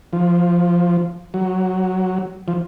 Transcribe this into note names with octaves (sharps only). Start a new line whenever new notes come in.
F3
F#3
F3